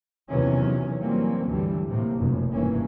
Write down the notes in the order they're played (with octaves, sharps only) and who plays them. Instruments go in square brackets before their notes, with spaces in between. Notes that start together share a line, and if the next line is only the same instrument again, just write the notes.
[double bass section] E2 C3 D#3 E3 F#3 C#4
E3 F#3 G3 A#3 C4 C#4
D2 G2 D3 E3 F#3 G3
A2 C3 A#3
F1 F#2 B2
F1 G2 B2 E3 A#3 C#4